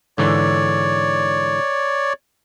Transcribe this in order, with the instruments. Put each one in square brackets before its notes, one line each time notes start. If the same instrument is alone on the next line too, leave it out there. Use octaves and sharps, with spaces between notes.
[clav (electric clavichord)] G#2 D3 E3 [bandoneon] C#5 D5